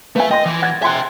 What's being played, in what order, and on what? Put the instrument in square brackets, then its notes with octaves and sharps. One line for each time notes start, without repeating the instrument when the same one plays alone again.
[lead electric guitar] A3 E5 [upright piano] B4 F5 G#5
[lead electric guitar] D#5 [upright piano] G5 C6 A#6
[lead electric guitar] E3
[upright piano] F#5 G#6 A6
[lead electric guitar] E5 G5 [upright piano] G#5 C6 F#6